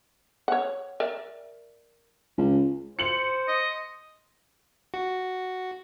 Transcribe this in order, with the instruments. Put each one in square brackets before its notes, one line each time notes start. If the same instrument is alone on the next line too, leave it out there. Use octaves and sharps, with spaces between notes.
[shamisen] C#5 F#5
A#4 D5 E5
[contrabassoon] C#2
[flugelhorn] C5 [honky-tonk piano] C#7 F#7
[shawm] D#5
[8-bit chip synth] F#4